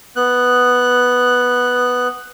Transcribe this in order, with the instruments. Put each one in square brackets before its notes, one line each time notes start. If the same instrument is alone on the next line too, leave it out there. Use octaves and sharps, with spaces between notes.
[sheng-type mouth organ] B3 F#6